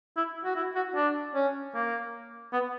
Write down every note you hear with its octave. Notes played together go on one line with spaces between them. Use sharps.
E4
F#4
E4
F#4
D4
C#4
A#3
B3